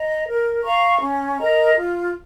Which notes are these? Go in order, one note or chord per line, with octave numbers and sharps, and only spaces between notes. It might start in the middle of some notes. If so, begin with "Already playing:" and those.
Already playing: D#5 A#5
A#4
F5 A#5 C#6
C#4
A#4 D#5 A#5
F4